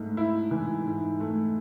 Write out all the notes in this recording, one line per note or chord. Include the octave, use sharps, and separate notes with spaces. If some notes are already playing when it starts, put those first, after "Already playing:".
Already playing: G#2 A3
E4
E3
G#2
A3